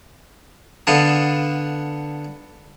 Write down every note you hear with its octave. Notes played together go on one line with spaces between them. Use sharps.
D3 B3 D4 F5 A5 D#6